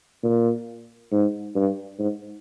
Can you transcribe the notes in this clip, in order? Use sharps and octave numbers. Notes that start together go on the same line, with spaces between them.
A#2
G#2
G2
G#2